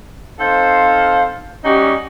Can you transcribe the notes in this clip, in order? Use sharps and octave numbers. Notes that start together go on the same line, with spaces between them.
C4 D#4 A4 C5 F5
G3 C#4 D#4 F#4 G4 D#5